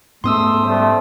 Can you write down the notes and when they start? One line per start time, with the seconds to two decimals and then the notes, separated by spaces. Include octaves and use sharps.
0.24 G#2 A3 B3 C#4 C6 D#6 E6
0.65 G3 A3 C5